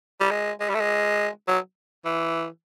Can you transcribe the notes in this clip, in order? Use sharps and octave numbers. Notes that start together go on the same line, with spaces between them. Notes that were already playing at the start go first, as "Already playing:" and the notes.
G3
G#3
G#3
G3
A3
G#3
F#3
E3